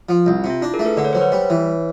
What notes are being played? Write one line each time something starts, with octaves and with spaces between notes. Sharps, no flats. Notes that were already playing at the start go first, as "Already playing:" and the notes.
F3
C2 F4
C3
F4
D4 E4
G#4 A#4
A3
A4 B4
D3 D5
C#5
F#3 C5
B4 C#5
G3
E3